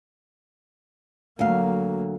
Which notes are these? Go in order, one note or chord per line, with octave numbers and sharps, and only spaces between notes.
D2 F#3 A#3 F5